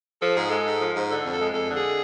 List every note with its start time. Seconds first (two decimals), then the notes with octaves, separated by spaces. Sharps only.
0.22 F3 A4
0.36 G#2 G#4
0.50 G#3 A4
0.66 G#2
0.81 F3
0.95 G#2
1.10 D3 A4
1.25 F2
1.32 A4
1.39 G#3
1.53 F2 A4
1.69 D3
1.76 G#4